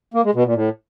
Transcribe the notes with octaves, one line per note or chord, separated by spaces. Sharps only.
A#3
G#3
B2
A#2
A2